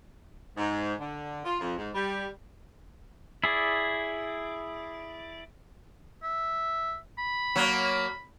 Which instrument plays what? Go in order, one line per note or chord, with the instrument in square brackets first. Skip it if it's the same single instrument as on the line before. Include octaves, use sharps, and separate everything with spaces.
[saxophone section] G#2
D3
F4
F2
G#2
G3
[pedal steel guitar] E4 G#4 D5
[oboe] E5
B5
[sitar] F#3 A#3